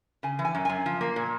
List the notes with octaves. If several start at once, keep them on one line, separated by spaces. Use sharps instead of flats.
C#3 G#5
E3
G#5
F#2
F#2 G#5
F3
A#3
A#2